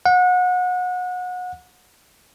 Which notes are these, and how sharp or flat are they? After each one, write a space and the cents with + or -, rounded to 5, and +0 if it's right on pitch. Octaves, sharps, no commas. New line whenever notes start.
F#5 -30